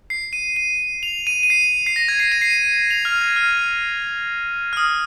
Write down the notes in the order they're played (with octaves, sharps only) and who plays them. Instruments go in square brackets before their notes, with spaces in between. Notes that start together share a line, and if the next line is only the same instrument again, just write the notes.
[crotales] C7
D#7
D#7
F7
D#7
D#7
C7
C7
A#6
G#6
C7
D#7
C7
D#7
F7
F6
G#6
F6
F6
D#6